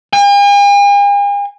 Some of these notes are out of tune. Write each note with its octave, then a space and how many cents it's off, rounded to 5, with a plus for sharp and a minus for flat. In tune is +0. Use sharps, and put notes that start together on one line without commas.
G#5 -45